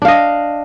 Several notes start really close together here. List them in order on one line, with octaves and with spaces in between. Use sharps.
D4 F5 D#5